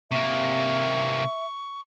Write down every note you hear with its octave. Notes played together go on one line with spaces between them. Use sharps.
C3 A#3 E5 C#6